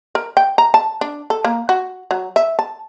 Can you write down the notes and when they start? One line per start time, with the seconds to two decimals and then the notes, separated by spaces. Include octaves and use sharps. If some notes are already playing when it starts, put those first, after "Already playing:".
0.15 A#4
0.37 G5
0.58 A#5
0.74 A5
1.01 D4
1.30 A4
1.45 A#3
1.69 F#4
2.11 F#3
2.36 E5
2.59 A5